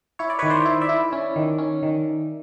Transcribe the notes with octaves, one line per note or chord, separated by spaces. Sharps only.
E4 C#5
D5
D#3 B4 C#5
C5 D5
E4
D5 E5
E4
C#4
D#3
C#4
D#3